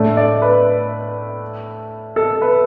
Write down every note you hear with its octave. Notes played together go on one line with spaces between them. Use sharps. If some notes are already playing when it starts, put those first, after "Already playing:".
Already playing: A2 A3 D4
D5
B4
A4
B4